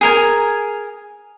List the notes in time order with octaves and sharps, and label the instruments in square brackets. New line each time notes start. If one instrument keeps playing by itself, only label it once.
[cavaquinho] G#4 A#4 G#5